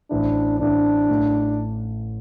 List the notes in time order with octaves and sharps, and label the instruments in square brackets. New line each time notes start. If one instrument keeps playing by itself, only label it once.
[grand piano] A1 A2 E3 C4 E4 [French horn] D4
[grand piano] A1 A2 E3 C4 E4 [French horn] D4
[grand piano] A1 A2 A3 E4